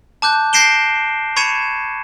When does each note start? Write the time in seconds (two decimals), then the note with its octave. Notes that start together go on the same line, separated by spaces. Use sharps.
0.22 A5 D6 F#6 G6
0.53 G6 A#6 C7 D7 E7 G7
1.36 B5 C#6 G#6 C#7 D#7 E7